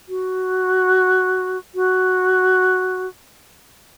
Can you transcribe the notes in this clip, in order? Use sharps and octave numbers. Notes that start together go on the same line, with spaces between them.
F#4
F#4